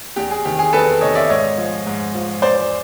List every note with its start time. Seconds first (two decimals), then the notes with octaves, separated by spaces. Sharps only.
0.16 E2 G4
0.31 G#4
0.45 C3 D#3 G4
0.59 G#4
0.73 E2 A4 B4
1.01 C3 D#3 C#5 D#5
1.15 D5 E5
1.29 G#2 C#5 D#5
1.58 F3
1.86 G#2
2.15 F3
2.42 E2 C5 D5